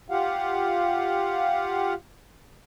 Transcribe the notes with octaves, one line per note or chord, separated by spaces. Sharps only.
F4 G4 F5 F#5